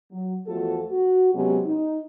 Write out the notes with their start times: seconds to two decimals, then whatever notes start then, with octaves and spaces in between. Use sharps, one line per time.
0.10 F#3
0.46 E2 F3 A3 F#4 A4
0.90 F#4
1.33 C3 F#3 G#3 B3 C#4 G4
1.65 D#4